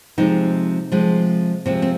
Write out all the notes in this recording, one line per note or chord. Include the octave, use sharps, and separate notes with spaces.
C3 F3 G#3 D#4
C3 F3 G#3
C3 F3 G#3 C4
C4